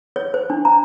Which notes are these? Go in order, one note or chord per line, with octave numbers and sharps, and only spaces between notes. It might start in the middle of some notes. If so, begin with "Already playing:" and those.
C#5
C5
D4
A#5